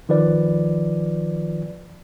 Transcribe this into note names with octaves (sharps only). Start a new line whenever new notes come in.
D#3 F3 B4 D5